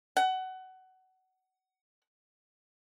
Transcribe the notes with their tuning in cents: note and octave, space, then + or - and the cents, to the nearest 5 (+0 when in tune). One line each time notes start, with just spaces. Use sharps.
F#5 +20